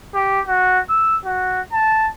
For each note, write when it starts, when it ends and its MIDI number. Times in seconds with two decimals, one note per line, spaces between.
0.15 0.40 67
0.47 0.81 66
0.90 1.17 88
1.25 1.61 66
1.73 2.10 81